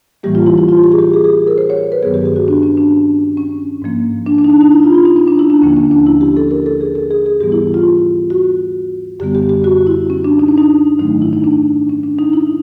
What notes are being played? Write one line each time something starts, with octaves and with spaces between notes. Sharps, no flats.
A2 E3 G3 A#3 G4
F4
E4
E4
F4
G4
G#4
G4
G#4
G#4
A#4
C5
C#5
B4
G2 D#3 F#3 B3 G#4
G4
G4
F#4
D4
C#4
D4
C#4
G#2 F3 A#3
D4
D4
D#4
D4
D#4
E4
F4
F4
D#4
C#4
D4
E4
D4
D#2 D3 F3 A#3 C#4
C#4
D4
E4
G4
A4
A#4
A4
G#4
A4
G#4
G#4
G#2 E3 G3 B3 G4
E4
F4
F#4
F#2 D3 G3 B3 G4
G4
G4
F#4
E4
C#4
D4
D#4
D4
D#4
G#2 D#3 F#3 A3 D#4
E4
D#4
D4
C#4
D4
D#4
E4